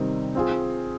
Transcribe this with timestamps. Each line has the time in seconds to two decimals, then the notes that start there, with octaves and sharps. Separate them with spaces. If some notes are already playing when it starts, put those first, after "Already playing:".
Already playing: C3 D#3 G3 C4 D#4
0.35 C4 F4 G#4